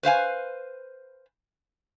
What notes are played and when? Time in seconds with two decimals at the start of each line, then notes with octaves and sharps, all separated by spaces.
0.03 B4 C5 F5 G#5